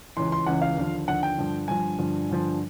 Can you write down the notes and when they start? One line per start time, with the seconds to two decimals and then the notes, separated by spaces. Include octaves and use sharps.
0.17 C#2 C#3 E3 C6
0.32 C6
0.46 C#2 C#3 E3 F#5
0.62 F5
0.77 D#2 D3 F3
1.08 D#2 D3 F3 F#5
1.23 G5
1.38 G2 D3 F3
1.68 G2 D3 F3 G#5
1.98 G2 D3 F3
2.29 G2 D3 F3